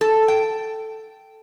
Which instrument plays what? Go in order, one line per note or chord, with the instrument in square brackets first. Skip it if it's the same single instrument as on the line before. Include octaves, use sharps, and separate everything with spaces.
[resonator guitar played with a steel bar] A4
G5